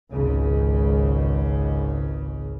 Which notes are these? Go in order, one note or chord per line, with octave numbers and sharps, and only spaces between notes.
G#1 C#2 C#3